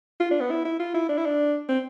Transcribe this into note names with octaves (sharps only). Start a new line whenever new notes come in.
F4
D4
B3
E4
E4
F4
E4
D4
E4
D4
C4